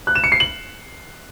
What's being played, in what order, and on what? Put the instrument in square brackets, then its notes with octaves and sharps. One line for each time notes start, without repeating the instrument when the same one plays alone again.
[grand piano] F#6
E7
C#7
C7
F#7